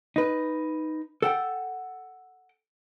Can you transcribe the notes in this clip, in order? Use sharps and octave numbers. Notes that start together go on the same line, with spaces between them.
D#4 B4
A4 F#5 G5